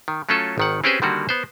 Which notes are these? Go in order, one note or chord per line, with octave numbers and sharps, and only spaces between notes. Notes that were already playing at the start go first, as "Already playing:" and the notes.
D#3
F#3 A3 C#4 F4 A4
G#1 D#3 F#5
C4 C#4 G4 G#4 B4 C5
D3 D#3 G3 A#3 F#4
B3 C5